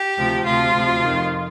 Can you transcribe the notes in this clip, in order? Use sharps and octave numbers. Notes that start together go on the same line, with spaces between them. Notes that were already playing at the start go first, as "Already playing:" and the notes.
Already playing: G4
D2 C3 F3
D2 C3 F3 F4
D2 C3 F3
F2 D#3